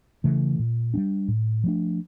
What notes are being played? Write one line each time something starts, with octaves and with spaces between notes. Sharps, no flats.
C#3 E3 A3
A#2
G3 A#3 D4
A2
F3 A3 D4